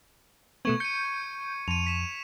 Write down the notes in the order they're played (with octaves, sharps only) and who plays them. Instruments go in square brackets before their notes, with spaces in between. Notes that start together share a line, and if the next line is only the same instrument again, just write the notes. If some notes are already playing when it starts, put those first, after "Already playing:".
[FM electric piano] B2 A3 B3 [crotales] C#6 G#6
[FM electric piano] G6 [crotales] C#7 D#7
[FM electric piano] F2 [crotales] D#7 F7
[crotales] B6 E7